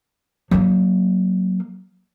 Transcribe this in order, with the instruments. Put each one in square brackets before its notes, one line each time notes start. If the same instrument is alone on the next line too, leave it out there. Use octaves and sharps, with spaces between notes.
[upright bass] F#3 A#3